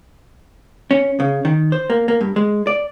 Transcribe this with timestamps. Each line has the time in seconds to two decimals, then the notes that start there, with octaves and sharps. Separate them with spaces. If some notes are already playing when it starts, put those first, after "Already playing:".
0.91 C#4
1.20 C#3
1.45 D#3
1.72 C5
1.90 A#3
2.08 A#3
2.21 G2
2.36 G#3
2.67 D5